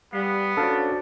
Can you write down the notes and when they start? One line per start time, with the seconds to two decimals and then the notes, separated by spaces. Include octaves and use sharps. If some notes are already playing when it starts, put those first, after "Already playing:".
0.13 G3 B3 F5
0.57 C#4 D4 F#4 A4 C5 D5 F5